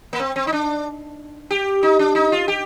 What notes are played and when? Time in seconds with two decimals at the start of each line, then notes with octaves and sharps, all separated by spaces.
0.13 A#3
0.19 C4
0.36 C4
0.47 D#4
0.53 D4
1.51 G4
1.83 D#4
1.99 D4
2.15 D#4
2.32 F4
2.48 G4